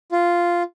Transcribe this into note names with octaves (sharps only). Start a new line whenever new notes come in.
F4